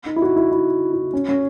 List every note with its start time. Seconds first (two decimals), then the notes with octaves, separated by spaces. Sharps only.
0.06 D#4
0.16 E4
0.22 F#4
0.36 E4
0.52 E4
0.93 E4
1.13 C#4
1.29 C#4